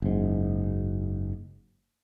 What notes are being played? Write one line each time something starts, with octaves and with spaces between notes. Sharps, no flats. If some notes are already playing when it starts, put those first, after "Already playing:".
F#1 G#2